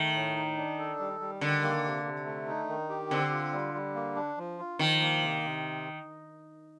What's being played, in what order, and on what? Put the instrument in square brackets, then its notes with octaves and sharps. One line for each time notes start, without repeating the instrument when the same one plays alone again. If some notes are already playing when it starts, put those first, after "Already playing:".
Already playing: [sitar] D#3 [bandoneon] A3
[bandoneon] A2
D#4
D4
A4
G3
G3
[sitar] D3 [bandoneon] D#3
[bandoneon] A#3
C3
C3
A3
D#4
D#3
G4
[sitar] D3 [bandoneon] C4
[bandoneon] F4
G3
G3
A#3
D4
F3
F4
[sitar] D#3 [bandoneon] F3
[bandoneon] A#3
C3
C3